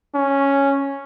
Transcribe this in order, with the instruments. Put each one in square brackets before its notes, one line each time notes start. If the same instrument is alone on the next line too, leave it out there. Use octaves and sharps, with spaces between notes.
[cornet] C#4